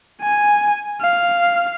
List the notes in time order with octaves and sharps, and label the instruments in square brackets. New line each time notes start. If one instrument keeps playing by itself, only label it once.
[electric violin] G#5
F5